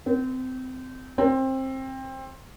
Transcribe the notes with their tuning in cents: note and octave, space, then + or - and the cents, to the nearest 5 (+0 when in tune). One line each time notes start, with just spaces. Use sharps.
C4 -25
C4 +20